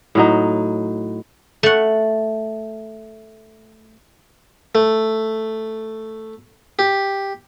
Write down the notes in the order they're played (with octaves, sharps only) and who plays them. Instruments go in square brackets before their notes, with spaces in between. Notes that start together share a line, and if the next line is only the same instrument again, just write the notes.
[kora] A2 F#3 D#4
[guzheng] A3 F#5
[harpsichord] A3
G4